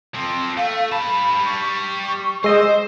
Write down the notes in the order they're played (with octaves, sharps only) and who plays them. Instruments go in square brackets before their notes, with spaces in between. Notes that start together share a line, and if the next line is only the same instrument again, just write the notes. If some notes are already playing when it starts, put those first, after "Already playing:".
[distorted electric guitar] F3 C4
[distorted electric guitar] A3 [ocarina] F5
[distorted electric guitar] G3 A5 [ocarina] B5
[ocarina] C#6
[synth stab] G#3 D#5 [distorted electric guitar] C5 [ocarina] E6